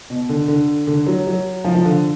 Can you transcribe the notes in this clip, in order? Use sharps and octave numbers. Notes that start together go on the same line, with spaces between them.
B2
D3
D3
D3
F#3
F#3
F3
F3
D3